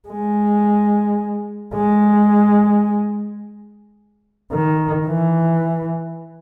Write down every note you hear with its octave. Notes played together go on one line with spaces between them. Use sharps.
G#3
G#3
D#3
E3